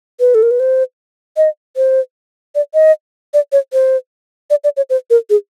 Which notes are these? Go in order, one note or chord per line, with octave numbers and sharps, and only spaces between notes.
B4
A4
A#4
B4
C5
D#5
C5
D5
D#5
D5
C#5
C5
D5
D5
C#5
C5
A#4
G#4